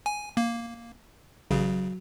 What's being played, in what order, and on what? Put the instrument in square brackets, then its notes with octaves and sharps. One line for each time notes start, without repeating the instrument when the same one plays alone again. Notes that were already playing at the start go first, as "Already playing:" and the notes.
[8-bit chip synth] G#5
A#3
[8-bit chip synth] A1 C#3 [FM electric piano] F#3